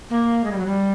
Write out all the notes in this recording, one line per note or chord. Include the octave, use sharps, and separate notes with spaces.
A#3
G#3
G3
F#3
G3